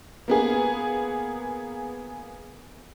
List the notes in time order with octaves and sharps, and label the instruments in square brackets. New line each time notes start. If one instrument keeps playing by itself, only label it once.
[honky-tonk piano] A#3 B3 G#4